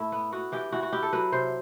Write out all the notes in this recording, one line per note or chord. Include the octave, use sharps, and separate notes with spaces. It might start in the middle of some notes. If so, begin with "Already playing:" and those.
Already playing: A2 E4
B3
B3 F#4
E3 G4
E3 F#4
F#4
E4 G4
A4
F#3 B4
C3 C5